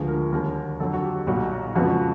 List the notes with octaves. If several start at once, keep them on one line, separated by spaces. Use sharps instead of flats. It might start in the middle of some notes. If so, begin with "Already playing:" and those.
Already playing: D2 D3 F3 G#3 B4
A#4
D#2 D3 G3 A#4
F2 D3 F#3 A4
F#4
G4
B1 A#2 G3 F#4
F2 C#3 F3 G#3 B3 F#4